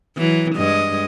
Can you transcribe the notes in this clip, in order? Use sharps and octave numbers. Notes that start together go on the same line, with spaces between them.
E3 F#3
G2 G#3 D#5